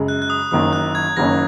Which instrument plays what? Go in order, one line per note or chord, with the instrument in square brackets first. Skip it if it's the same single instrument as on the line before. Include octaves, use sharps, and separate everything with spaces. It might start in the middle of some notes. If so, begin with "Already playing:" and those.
Already playing: [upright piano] F#2 C#3 G#3
[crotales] F#6
F#6
D#6
[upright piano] F#1 F#2 D#3 A#3 C#4 [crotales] D#6
[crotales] F#6
G#6
[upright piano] F#1 F#2 D#3 A#3 C#4 [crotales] A#6